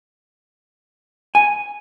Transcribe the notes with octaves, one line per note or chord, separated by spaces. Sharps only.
G#5